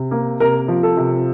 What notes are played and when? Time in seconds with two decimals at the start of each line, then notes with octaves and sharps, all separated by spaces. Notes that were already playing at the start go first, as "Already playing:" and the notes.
Already playing: C3
0.11 A#3
0.40 C3 A#4
0.68 F3
0.83 A4
0.97 C3